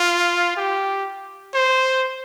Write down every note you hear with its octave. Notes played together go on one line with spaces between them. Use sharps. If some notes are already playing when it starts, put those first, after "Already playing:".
Already playing: F4
G4
C5